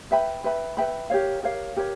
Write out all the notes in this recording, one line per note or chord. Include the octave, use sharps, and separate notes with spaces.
B4 E5 G5 B5
B4 E5 G5 B5
B4 E5 G5 B5
G4 A#4 C#5 F5
G4 A#4 C#5 F5
G4 A#4 C#5